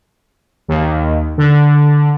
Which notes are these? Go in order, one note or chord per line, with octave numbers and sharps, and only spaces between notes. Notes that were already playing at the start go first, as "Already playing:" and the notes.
D#2
D3